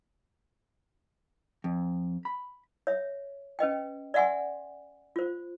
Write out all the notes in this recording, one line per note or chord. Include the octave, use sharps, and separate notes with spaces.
F2
B5
C#5 E5
C#4 B4 D#5 G5
D5 E5 F#5 G#5 C6
F4 C5